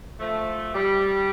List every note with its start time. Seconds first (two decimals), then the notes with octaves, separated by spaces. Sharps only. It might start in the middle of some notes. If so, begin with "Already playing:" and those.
0.20 F3 A3
0.74 G3